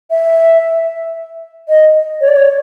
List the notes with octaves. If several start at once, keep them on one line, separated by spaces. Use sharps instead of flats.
E5
D#5
C#5
D5
C#5